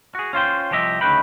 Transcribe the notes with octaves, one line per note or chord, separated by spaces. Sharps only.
F#4 G#4
C#4 F4 C5 G5
C2 F3 G4 D#5 E5
D2 C#3 D#4 B4 G5 B5